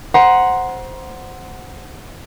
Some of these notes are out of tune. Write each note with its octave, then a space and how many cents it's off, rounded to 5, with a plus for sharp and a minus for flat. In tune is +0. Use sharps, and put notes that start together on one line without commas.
C5 +0 F#5 +0 A#5 +30